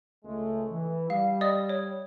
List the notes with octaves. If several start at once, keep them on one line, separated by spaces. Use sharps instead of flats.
C#2 G#3 A3
E3
G3 F5
D5 D#5 D#6
C#5